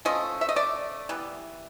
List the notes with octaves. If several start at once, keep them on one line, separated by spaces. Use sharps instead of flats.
F3 A3 C#4 D#5
E5
D#5
D5
E3 G3 B3